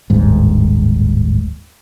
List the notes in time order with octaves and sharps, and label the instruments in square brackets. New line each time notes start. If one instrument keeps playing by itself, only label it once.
[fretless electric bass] D1 G1 D#2 G#2